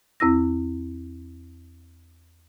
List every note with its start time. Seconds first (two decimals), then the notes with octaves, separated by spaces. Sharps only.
0.20 E2 C4 E4 E6 A#6